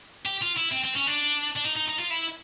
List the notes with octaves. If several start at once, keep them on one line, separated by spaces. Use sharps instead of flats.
G4
F4
E4
C4
C4
C#4
D4
D4
D#4
D#4
D#4
F4
E4